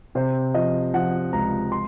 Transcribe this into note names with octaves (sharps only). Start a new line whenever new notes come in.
C3 C5
F3 D#5
F3 F#5
C#2 A#5
C6